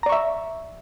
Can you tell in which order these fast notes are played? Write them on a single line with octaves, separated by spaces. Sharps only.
A#5 D5 C#6 E5